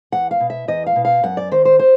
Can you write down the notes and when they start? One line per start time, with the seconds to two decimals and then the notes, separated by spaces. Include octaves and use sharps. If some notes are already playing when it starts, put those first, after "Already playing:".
0.12 E2 F#5
0.31 F5
0.40 B2
0.50 E5
0.68 E2 D#5
0.86 F5
0.96 B2
1.05 F5
1.23 F#2 F#5
1.37 D5
1.52 D#3 C5
1.65 C5
1.79 C5